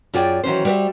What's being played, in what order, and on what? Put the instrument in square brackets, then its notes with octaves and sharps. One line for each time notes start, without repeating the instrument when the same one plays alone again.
[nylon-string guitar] F#2 F4 G#4 D5 G5
D#3 E3 F#3 C#4 C5
G3 F#4 A#4 C5 E5